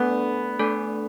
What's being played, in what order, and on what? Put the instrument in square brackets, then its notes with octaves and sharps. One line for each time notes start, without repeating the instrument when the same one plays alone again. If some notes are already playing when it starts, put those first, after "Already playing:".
Already playing: [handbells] A3 D4 A4 D5 G#5 [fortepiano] B3
[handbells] A3 D4 A4 D5 G#5